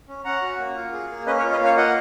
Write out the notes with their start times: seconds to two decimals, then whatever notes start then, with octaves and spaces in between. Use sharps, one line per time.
0.08 C#4
0.25 C#4 F#5 A#5
0.42 F#4
0.59 A#3
0.75 F4
0.93 G#4
1.10 A#3
1.27 C#4 B4 D#5
1.39 A#4 C#5
1.43 F4
1.52 B4 D#5
1.60 A#3 C#5 F5
1.77 F4 D#5 F#5